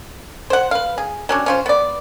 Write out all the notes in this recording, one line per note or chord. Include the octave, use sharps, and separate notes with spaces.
C5 F#5
B4 F5
G#4
F#3 C#4 D4
C#4 F4 C5
B3 D5